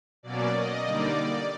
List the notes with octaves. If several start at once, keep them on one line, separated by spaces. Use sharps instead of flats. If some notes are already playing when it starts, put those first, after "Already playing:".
B2 F#3 A#3 C#4 D5
D#5
D3 G3 A#3 D#4 D5